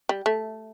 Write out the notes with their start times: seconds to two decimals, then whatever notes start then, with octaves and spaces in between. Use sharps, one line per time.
0.09 G3
0.26 A3